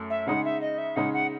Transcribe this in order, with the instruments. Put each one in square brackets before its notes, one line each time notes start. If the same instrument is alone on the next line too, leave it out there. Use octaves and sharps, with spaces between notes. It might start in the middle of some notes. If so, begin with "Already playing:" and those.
Already playing: [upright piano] F#2 A3
[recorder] E5
[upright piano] C#3 G#3 D#4 [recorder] F#5
[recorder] E5
D#5
E5
[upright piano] C#3 G#3 D#4 [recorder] F#5
[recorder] F#5